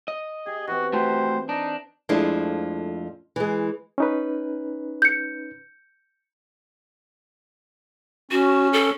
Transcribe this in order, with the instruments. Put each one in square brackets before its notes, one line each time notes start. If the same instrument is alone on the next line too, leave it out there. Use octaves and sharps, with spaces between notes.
[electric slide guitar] D#5
[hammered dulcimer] G4 [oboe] G#4
[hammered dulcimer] E3 C4 [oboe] F#4
[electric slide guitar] A3 F#4 G4 [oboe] C5
[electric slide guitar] D4 [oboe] D#4
[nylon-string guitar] F2 F3 G#3 A3 D4 E4
E3 G#3
[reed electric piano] C#4 D#4 B4
[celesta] G6 C#7
[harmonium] C#4 [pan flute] F#4
[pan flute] A4